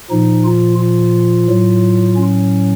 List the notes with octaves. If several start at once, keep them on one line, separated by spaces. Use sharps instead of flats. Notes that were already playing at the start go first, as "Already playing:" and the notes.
A#2 F3 D#4
F4
F4
A2 F#3
C#4